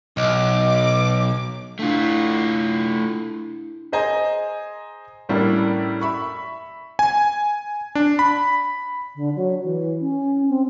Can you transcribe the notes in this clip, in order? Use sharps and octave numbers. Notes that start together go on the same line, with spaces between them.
B1 D#5 D6
A3 D4 E4 F4
G#4 C5 D#5 G#5 A#5
A2 G3 A#3 C#4 D4 E4
E5 B5 C#6
G#5
D4
B5
D3
F#3
E3
C#4
C4